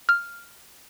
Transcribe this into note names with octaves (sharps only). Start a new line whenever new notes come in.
F6